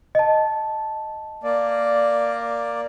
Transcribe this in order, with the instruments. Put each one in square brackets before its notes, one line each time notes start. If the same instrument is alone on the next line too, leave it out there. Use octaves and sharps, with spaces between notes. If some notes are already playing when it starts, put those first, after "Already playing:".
[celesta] D#5 A5
[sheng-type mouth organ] A#3 D5